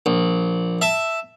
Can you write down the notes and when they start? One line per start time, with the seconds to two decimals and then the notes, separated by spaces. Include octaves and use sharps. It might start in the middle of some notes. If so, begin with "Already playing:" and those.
0.06 A#1
0.81 E5 A5